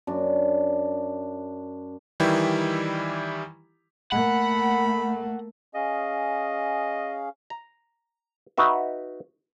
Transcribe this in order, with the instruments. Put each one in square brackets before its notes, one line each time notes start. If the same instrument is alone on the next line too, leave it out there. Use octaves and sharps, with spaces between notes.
[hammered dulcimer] F#2 D4
[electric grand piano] D#3 E3 G3 E4 G4
[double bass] A3 A#3 [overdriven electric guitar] F#5 [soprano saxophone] B5
[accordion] C#4 G#4 F5 [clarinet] D#5
[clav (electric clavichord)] A#5
D#4 F#4 B4 E5